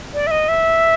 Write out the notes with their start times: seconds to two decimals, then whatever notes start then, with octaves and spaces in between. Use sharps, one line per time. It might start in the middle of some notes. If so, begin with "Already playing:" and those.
0.14 D5
0.27 E5
0.31 D#5
0.49 E5